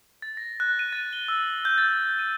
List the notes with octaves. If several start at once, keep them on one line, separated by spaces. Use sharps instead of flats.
A6
A#6
F#6
D#7
A6
G7
E6
G6
A6
D#7